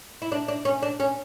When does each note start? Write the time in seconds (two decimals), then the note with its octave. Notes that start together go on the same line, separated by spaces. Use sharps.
0.22 E4
0.32 D4
0.48 D4
0.65 C#4
0.83 D4
1.00 C#4